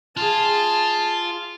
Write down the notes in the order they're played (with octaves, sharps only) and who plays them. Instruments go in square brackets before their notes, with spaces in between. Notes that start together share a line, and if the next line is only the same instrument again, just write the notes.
[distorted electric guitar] F4 [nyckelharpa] G#4 A5